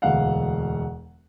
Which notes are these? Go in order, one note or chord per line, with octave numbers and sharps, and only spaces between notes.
E1 D2 F5 F#5